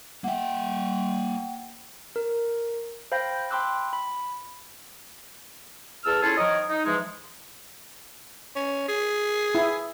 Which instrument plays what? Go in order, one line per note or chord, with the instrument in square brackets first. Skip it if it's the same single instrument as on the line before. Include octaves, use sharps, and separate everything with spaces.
[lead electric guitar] A#3 E5 [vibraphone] F#5 G5
[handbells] A#4
C5 F5 G5 B5 G6 A#6
G5 B5 C6 D6 E6 F#6
B5
[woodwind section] E2 G#4 A5 E6 F6
C#4 E4 F4 G#4 A4
D#3 F3 A#4 C#5 D#5
D#4
E3 F3 G#3
[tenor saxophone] C#4
G#4
[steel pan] E4